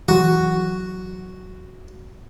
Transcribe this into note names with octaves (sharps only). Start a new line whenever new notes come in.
E3 F#3 F#4